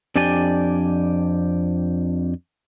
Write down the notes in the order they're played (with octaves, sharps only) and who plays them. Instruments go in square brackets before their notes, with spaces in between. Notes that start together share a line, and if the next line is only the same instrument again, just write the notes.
[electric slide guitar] F2 D4 G4 D5 G5 G#5